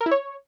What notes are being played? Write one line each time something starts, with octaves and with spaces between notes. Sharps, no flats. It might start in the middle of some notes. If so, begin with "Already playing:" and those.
A#4
E4
C#5